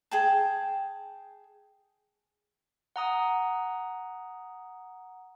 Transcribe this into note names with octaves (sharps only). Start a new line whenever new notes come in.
G#4 G5 A5
F#5 A#5 D#6